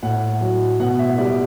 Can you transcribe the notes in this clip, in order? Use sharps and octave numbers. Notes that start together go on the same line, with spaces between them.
A2 F#5
F#3
B2 F#5
E5
G3 D5